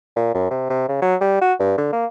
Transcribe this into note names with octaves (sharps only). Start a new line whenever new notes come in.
A#2
F#2
C3
C3
C#3
F#3
G3
F#4
G2
D3
A#3